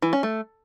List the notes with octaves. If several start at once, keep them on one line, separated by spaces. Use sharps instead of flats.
E3
C#4
A3